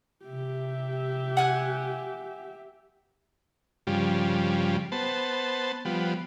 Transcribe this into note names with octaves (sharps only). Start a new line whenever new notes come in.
C3 G4 E5
F#5 G#5 F#6
G2 C#3 F3 G3
B3 C5 A5
F3 G3 B3